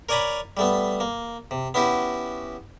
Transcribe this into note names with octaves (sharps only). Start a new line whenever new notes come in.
A#4 C#5 D5 G#5 A#5 B5
G3 A3 B3
A#3
C3
B3 C#4 E4 F#4 G4